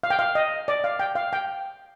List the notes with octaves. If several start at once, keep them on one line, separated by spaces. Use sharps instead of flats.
F5
G5
F5
D#5
D5
F5
G5
F5
G5